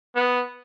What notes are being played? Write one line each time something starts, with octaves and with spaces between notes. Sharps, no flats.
B3